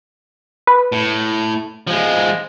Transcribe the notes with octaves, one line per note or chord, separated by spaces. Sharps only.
B4
A2
F3 G#3